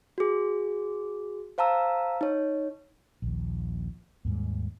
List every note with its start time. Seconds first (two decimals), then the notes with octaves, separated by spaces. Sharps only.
0.18 F#4 G#4
1.58 C5 F5 A5 A#5 E6
2.21 D#4 C#5
3.22 A#1 D#2
4.25 D#2 G#2 G3